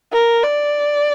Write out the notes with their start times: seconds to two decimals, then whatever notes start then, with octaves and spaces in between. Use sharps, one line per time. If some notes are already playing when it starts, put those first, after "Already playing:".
0.13 A#4
0.43 D5